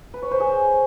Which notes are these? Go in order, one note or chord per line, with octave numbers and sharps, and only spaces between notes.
B4
C#5
C5
G#4